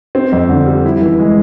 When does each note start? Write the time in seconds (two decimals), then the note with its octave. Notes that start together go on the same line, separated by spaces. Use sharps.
0.15 C4
0.32 F2
0.49 D3
0.66 G3
0.85 E4
1.02 E3
1.19 G#3